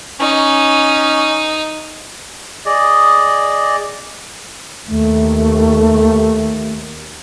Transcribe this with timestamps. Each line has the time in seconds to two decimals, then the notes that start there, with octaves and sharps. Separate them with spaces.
0.20 C#4 D#4
2.66 G#4 D5 D#5
4.87 D#2 A3